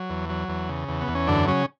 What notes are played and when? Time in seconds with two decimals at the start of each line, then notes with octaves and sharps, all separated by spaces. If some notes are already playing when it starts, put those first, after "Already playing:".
Already playing: F#3
0.10 E2
0.29 F#3
0.49 E2
0.69 C#3
0.88 E2
1.01 B3
1.08 E2
1.15 C#4
1.27 F#2 D3 D4
1.48 C#3 F#3 C#4